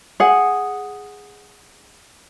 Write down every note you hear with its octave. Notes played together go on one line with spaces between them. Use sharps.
G#4 F#5